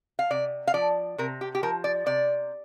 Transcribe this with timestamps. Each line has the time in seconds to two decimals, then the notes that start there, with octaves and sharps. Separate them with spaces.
0.19 F5
0.30 C3 D5
0.67 F5
0.74 F3 D5
1.18 C3 A#4
1.41 G4
1.55 G4
1.63 F3 A#4
1.84 D5
2.06 C3 D5